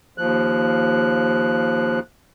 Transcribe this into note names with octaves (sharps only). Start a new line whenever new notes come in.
D#2 F3 F#6